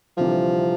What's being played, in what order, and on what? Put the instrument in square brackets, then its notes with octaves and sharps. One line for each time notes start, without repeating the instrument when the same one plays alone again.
[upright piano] D2 C3 E3 G3 [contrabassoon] F3